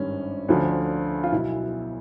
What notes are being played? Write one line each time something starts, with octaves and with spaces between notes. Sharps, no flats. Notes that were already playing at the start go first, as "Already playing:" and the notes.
Already playing: G#1 G2 D#3 C#4
D2 D3 F3
F4
B1 B2 E4